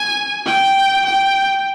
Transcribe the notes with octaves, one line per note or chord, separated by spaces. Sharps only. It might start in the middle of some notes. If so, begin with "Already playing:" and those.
Already playing: G#5
G5
G5